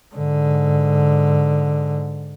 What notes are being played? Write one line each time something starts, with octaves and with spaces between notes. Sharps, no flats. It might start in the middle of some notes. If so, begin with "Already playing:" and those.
G#2 D3